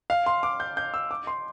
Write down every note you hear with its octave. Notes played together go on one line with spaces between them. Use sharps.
F5
C6
D6
G6
G6
E6
D6
C6